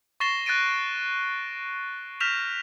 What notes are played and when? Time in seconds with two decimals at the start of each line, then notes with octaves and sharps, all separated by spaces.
0.20 C#6 A6 A#6 C7 E7 G7
0.46 F#6 A6 A#6 D7 D#7
2.20 F6 G6 A#6 B6 E7 F7